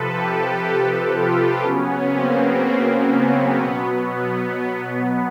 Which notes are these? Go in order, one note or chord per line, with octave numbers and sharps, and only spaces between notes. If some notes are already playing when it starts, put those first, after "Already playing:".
Already playing: C3 F3 A4 B4
G4 A4
F4 G4
C#3 F#3 B3 C#4
A#3 C4
A#3
B3
B2 F#3
B3